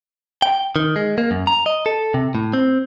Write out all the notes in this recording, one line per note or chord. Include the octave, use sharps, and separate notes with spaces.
G5
D#3
G#3
A#3
F#2
A#5
D#5
A4
C3
A2
C4